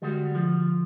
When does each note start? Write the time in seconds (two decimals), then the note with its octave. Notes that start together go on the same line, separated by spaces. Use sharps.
0.02 D3 G3 G#3 F#4
0.35 F3